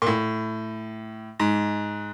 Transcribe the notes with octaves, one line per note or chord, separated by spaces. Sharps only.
A#2
A2
G#2